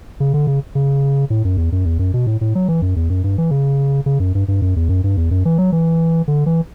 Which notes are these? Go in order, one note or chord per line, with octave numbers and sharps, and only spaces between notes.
C#3
D3
C#3
C#3
A2
F#2
E2
F#2
E2
F#2
B2
A2
A2
F#3
E3
F#2
E2
F#2
G2
E3
C#3
C#3
F#2
G2
G2
F#2
E2
F#2
G2
E2
F#2
E3
F#3
E3
D3
E3